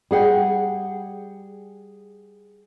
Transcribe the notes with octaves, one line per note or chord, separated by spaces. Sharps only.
G3 G#4 F#5 G5